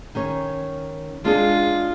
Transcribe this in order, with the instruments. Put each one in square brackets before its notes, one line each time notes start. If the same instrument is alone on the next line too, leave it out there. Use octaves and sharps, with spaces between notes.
[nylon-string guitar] D#3 C#4 C#5
[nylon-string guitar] G#3 D4 G#4 [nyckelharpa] F4